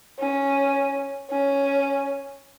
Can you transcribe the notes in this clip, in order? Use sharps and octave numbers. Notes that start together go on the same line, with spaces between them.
C#4
C#4